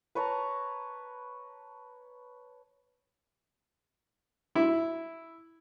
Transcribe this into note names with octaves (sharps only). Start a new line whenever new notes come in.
B4 C#5 A5 A#5
E4